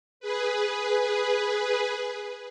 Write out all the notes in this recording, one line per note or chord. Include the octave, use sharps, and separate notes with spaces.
G#4 B4